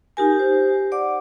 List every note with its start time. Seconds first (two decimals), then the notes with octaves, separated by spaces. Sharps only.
0.17 D#4 F4 G4 A#4 G#5
0.36 G4 C5
0.92 D5 F#5 D6